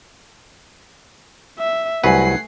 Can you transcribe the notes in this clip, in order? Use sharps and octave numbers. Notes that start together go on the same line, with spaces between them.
E5
C2 F#3 A3 B4 F#5 G#5 C7